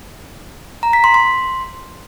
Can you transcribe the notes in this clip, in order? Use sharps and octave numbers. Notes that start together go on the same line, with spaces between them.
A#5
B6
C6
C6